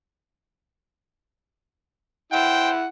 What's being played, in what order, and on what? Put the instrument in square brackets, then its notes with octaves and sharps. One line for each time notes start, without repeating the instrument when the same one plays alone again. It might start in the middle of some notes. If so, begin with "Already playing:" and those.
[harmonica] E4 F#5 [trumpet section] C5 G5